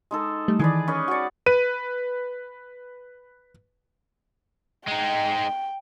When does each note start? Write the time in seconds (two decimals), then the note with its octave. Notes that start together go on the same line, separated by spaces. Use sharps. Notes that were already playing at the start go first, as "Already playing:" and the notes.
0.11 G#3 D#4 A4
0.48 G3 A3
0.59 D#3 E3 G#4 B4 D5
0.88 C#4 B4 D#5
1.08 F#4 D5 C#6
1.46 B4 D#7
4.88 G#3 D#4 G5